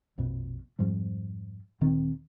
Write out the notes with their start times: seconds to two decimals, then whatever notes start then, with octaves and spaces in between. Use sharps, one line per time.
0.18 A#1 F2 B2
0.79 F2 G#2 F3 G3
1.81 D1 A#2 D#3 C4